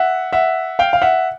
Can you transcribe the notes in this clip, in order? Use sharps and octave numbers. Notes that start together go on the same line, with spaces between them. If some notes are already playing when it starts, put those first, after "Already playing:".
Already playing: E5 F#5
E5 F#5
F5 G5
F5
E5 F#5